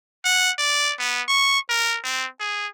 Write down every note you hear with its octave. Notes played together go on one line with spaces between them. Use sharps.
F#5
D5
B3
C#6
A#4
C4
G#4